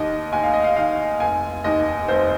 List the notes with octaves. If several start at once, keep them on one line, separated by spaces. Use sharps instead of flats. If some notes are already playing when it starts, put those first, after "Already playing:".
Already playing: D#2 D#3 D#5
D#2 G#5
F5
D#5
F5
D#3 F5
F1 G#5
D#2 D#3 D#5
F1 C5